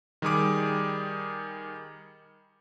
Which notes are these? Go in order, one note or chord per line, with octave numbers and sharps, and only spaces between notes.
D#3 G3 G4 G#4 B5 D6